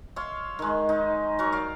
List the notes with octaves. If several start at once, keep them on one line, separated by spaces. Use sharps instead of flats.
C#5 E5 F5 C6
D#3 G#3
D#4
F#3 A#4 C#6
D5 F5